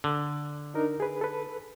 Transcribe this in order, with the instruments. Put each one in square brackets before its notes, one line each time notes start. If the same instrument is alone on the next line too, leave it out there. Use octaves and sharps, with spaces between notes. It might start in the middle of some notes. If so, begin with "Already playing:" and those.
[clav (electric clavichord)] D3
[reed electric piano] D4 D#4 A#4
G#4 B4
A4 B4